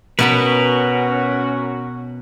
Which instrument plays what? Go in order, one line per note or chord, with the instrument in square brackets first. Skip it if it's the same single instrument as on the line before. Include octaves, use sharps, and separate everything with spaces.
[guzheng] B2 F#5 B5 [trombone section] C#4 F#4 [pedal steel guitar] A#4 B4